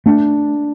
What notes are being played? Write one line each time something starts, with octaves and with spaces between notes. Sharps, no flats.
A3 D4